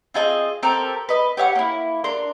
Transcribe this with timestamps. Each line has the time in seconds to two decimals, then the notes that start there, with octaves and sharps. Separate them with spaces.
0.14 C4 F4 G#4 D#5
0.63 C4 G4 A4 A#4
1.09 B4 D#5
1.37 G4 C#5 E5 F#5
1.55 A#3 E4
2.04 D4 A#4 C6